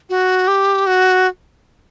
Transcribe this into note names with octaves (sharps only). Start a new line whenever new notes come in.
F#4
G4
F#4